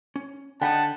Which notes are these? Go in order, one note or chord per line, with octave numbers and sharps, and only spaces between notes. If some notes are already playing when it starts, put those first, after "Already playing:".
C#4
D3 D#4 F#5 G5 A5 B5